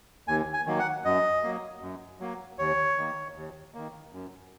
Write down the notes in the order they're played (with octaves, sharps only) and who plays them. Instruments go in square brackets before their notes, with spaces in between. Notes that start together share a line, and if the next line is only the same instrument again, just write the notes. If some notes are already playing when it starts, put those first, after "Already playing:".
[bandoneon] D#2 G#5
G#5
D#3 F#3 A#3
F#5
F#2 D#5
F#3 A#3
F#2
F#3 A#3
D#2 C#5
D#3 A#3
D#2
D#3 A#3
F#2